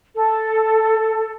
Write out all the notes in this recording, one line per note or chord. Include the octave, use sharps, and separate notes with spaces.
A4